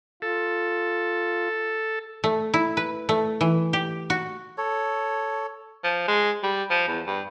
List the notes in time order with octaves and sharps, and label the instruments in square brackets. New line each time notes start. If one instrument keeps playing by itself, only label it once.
[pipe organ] F4 [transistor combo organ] A4
[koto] A3
E4
B4
A3
E3
G4
F#4
[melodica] A4 C#5
[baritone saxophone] F3
G#3
G3
F3
E2
G2